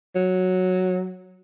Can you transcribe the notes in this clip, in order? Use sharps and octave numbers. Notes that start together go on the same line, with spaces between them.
F#3